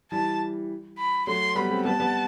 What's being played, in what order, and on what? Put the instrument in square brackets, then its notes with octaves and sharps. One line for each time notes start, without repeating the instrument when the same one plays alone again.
[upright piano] E3 G3 [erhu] A5
[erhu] B5
[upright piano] F#3 A3 [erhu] C6
[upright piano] G3 B3 [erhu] B5
[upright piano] A3 C4
[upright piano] G3 B3 [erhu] A5
[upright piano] G3 B3